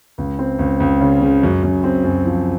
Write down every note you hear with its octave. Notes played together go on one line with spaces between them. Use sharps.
C#2
C4
C#2
C#2
C#3
C#3
F#2
F#2
C4
F#2
F3